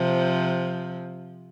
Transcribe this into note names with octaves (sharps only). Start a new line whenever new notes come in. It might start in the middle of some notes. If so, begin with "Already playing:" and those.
Already playing: C3 F3